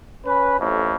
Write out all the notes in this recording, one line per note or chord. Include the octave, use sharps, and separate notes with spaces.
C#4 B4
A1 F2 A2